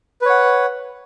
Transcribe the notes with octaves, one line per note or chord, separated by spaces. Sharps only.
B4 C#5 F#5